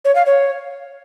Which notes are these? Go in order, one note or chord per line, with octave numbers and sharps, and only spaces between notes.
C#5
F5
C#5